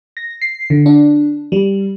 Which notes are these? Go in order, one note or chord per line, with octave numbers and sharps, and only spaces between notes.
A#6
C7
D3
D4
G3